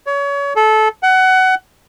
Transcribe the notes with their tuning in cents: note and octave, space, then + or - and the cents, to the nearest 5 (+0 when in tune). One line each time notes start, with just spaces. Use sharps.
C#5 +30
A4 -20
F#5 +20